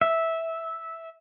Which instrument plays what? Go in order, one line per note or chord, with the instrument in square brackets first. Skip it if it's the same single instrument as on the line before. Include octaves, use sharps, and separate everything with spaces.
[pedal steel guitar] E5